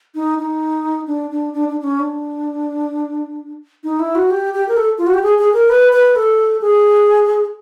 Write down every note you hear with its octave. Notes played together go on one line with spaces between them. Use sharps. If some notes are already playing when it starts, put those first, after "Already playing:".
D#4
D#4
D4
D4
D4
D4
D4
C#4
D4
D#4
E4
F#4
G4
G4
A#4
A4
F4
F#4
G4
G#4
G#4
A#4
B4
B4
A4
G#4